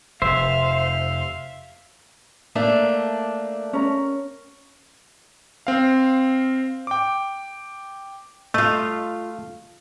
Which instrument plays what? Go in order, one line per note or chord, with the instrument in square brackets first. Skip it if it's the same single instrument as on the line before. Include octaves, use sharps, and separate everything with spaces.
[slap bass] F1 [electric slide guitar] C5 [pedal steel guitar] E5 [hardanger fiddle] F5
[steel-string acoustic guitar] A3 A#3 D4
[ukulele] C#4 A#4
[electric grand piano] C4 F5
G5 D6
[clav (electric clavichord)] A3 [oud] F4 D#5